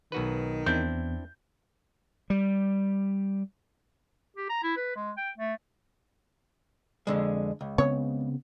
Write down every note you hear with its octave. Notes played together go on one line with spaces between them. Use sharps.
B1 D#3 F#4 B4
E2 C4 D4 E4 G6
G3
G4
A#5
E4
B4
G#3
G5
A3
F2 D3 G#3
C#2
C#3 B3 C4 C#5